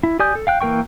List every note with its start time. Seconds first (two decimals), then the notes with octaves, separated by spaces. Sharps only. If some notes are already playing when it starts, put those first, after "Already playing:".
0.03 E4
0.19 G4 D5 G#5 D#6 G6
0.35 A4
0.47 F5 G5 F#6
0.61 E3 A#3 A#4 G5 C#6